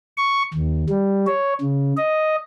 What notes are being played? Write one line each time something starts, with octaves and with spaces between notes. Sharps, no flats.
C#6
D#2
G3
C#5
C#3
D#5